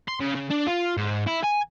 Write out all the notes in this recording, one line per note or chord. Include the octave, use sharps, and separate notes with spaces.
C6
C#3
C#3
D4
F4
G#2
E4
G#5